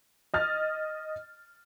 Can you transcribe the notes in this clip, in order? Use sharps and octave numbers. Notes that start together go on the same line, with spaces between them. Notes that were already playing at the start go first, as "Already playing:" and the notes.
D#5 F6 A6